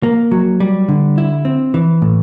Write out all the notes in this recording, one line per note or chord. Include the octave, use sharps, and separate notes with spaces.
A#3
F#3
G3
D3
E4
C4
E3
A2